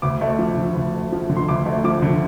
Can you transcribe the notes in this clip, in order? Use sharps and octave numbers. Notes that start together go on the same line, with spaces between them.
D2 D6
A3
F3
D3
D2
A3
F3
D3
C6
D2 D6
A3
F3 D6
D3